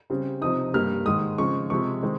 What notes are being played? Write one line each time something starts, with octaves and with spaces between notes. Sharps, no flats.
C#3 G3 C4
C3 F3 C4 D#4 D#6
G2 G3 A#3 F6
G#2 D#3 G#3 D#4 D#6
C#3 F3 G#3 C4 C#6
C3 F3 G#3 C#6
D#3 G#3 C4 D#4